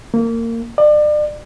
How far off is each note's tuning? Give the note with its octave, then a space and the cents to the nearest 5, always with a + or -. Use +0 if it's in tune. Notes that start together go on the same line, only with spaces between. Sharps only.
A#3 -25
D5 +35